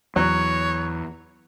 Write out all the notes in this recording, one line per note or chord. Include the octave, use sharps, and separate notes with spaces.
E2 F#3 C#5